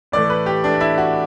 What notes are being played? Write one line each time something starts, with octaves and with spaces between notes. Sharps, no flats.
A2 E3 A3 D5
B4
G4
A2 E3 A3 D4
E4
F#4